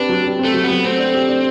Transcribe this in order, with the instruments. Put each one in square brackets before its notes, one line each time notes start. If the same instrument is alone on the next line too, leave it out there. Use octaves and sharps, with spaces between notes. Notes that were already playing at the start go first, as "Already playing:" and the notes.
Already playing: [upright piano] C4 G4 B4 [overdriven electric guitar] D4
[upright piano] F#3
G4
C4
[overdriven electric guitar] A3
[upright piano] F#3
[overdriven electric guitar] B3
[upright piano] F#3
[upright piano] A3 [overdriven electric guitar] C4
[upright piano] D4
G4
D4